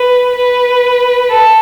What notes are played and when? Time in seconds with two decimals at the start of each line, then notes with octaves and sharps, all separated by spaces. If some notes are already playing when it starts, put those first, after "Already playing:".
Already playing: B4
0.35 B4
1.30 A4